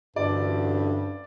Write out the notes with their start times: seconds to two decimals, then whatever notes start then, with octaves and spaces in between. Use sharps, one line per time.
0.16 A1 D2 G2 D5